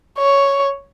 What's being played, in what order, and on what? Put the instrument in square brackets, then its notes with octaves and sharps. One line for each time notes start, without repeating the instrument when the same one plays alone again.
[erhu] C#5